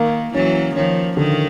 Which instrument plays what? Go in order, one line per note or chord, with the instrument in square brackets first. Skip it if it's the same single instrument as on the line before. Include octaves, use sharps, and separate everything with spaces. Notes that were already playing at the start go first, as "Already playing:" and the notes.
Already playing: [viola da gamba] D#3 [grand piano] A#3
[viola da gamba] E3 F#3 [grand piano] C#4
[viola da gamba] D#3 F3 [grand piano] C#4
[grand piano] D3 [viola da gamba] D#3